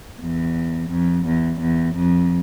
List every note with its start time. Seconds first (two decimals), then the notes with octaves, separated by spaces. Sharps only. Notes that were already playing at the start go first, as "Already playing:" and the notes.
0.21 E2
0.91 F2
1.26 E2
1.60 E2
1.96 F2